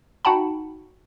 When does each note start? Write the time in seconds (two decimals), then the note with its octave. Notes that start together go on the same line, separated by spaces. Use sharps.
0.25 D#4 F#4 F#5 G5 A5 B5